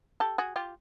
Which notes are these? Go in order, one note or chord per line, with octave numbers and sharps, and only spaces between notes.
G4 A4
F#4 G#4
F4 G4